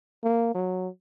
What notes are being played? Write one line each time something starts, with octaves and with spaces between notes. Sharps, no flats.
A#3
F#3